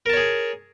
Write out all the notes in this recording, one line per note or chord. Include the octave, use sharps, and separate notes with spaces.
G#4 A#4 C#5 A5